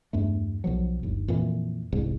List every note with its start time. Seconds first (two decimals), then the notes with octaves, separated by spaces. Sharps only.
0.13 E2 G2 A3
0.64 B1 F3 F#3
1.03 G1 D#2
1.28 F2 A#2 E3
1.92 E1 C2 G#2